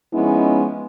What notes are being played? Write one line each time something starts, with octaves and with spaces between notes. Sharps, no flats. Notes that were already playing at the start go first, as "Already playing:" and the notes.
F3 G#3 B3 C#4 D#4 E4